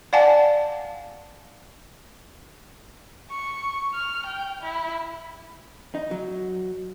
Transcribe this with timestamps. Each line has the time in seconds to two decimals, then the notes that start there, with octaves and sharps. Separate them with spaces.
0.13 D5 F5 F#5 G#5 A5
3.31 C#6
3.94 F6
4.26 G5
4.61 E4
5.95 D#4
6.11 F#3